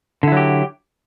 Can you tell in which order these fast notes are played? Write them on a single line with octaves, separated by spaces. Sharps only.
D3 E4 F#3 G4